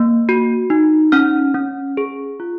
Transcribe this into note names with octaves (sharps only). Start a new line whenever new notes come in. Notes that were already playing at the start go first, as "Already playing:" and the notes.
Already playing: A#3
F#4
D#4
C#4 F6
C#4
G#4
F4